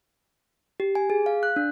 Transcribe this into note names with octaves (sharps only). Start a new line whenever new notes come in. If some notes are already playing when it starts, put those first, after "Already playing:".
G4
G#5
G#4
F5
F#6
D4